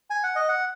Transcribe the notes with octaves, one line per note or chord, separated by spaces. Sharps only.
G#5
F#5
D#5
F#5